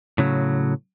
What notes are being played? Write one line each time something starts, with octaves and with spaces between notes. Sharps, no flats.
A2 C#3 F#3